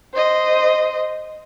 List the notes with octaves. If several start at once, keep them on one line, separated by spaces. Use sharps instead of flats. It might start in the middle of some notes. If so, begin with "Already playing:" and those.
C5 D#5